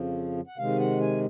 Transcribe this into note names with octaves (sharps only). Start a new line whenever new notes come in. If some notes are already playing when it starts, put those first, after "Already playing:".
Already playing: F2 C#3 F3
F#5
C3 D#3 G#3 F5
F#5
G#5